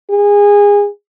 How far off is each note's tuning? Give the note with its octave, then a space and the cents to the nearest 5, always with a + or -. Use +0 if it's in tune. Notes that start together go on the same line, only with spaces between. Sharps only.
G#4 -25